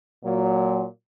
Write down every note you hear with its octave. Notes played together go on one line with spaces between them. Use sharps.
A#2 F#3